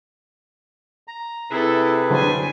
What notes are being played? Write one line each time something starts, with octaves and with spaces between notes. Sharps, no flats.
A#5
C3 E4 G#4 A4 B4
D3 F#3 D4 C5 G#5